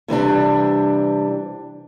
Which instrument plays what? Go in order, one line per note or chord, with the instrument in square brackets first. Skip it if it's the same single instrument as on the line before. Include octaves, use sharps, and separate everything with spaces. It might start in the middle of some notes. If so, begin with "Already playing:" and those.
[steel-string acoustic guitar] C3 E3 G3 D4